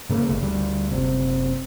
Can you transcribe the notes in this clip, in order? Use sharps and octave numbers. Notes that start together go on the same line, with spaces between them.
G#2 C#3 A#3
G1 C#3 A3
D2 G3
F#1 C3